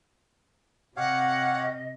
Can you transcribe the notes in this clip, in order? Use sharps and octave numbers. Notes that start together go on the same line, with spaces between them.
C3 G4 C#5 D#5 F5 F#5